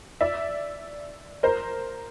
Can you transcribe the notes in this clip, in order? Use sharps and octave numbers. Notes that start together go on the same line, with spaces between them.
D5 E5
A#4 C5